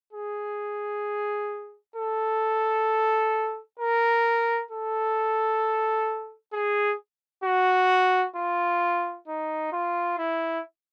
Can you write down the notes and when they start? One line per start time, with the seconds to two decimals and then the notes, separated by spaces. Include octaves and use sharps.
0.13 G#4
1.95 A4
3.79 A#4
4.71 A4
6.53 G#4
7.44 F#4
8.36 F4
9.28 D#4
9.73 F4
10.18 E4